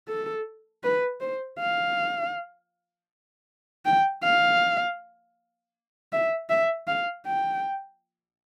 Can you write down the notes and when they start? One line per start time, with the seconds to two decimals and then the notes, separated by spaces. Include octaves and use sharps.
0.08 A4
0.84 B4
1.21 C5
1.60 F5
3.85 G5
4.24 F5
6.12 E5
6.50 E5
6.87 F5
7.26 G5